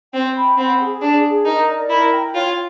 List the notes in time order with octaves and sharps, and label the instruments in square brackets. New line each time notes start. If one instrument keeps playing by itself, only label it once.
[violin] C4 [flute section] G5
[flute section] B5
[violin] C4 [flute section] F#5
[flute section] G#4
[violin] D4 [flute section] G#4
[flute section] G#4
[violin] D#4 [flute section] A#4
[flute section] D5
[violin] E4 [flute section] A#4
[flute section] G5
[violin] F4 [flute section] C#5